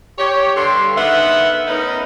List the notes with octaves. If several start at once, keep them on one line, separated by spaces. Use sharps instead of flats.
G4 C#5
G2 D3 C6
G#2 D3 D#3 B3 E5
A3 B3 C#4 D#4 A#4 B4